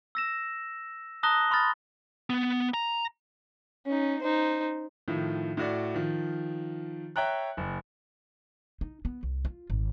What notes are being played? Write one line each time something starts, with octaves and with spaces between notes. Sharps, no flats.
E6 A#6 E7
A5 A#5 D#6 F#6 A#6 G7
B5 C6 D#6 F6 A6
B3
A#5
C#4 D#4
D#4 C5
A2 D#3 F3
A2 F#4 D5
D#3 F3
C#5 E5 G5 A#5 F#6
F#1
D#4
B3
C2
F4
G#1